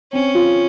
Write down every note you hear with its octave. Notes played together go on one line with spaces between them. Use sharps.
C4 C#4
F4